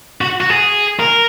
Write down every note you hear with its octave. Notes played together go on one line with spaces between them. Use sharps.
F#4
F#4
G#4
A#4